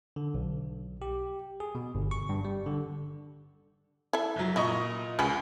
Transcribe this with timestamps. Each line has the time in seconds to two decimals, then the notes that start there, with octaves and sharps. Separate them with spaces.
0.16 D3
0.34 B1
1.02 G4
1.60 G#4
1.75 B2
1.95 G1
2.11 C#6
2.29 G2
2.45 G3
2.66 D3
4.13 E4 A4 E5
4.36 F#1 F#3
4.56 A#2 E4 D#5 C#6
5.19 C#2 C#3 C#4 B4